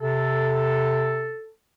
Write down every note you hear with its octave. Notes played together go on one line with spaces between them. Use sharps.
C3 A4